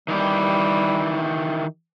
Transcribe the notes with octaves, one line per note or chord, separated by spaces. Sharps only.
D#3 E3 G3 G4